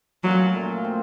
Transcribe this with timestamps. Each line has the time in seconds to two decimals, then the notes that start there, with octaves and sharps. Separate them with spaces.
0.24 A#2 F#3 A3 C#4 F4
0.54 A#2 A3 C#4 F4
0.84 F3 C4 F4